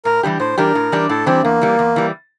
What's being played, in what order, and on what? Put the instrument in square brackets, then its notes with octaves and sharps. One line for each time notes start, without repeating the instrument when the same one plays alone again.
[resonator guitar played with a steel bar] A2 [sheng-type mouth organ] A#4
[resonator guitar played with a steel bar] E3 G3 D4 G4
[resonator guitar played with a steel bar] A2 [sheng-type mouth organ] C5
[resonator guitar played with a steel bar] E3 G3 D4 G4 [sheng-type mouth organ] A#4
[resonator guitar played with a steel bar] A2
E3 G3 D4 G4
[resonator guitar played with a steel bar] A2 [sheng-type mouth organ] A4
[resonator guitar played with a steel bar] E3 G3 D4 G4 [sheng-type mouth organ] C4
[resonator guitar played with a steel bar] E2 [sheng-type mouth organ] A#3
[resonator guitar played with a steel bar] E3 G3
E2
E3 G3